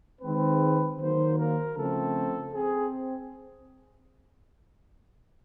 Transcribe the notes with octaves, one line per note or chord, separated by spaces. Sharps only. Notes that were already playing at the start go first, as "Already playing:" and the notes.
D#3 G#3 C4 B4
D#3 F#3 A#3 C5
A#4
C#3 F3 A3 C4 A4
C4 G#4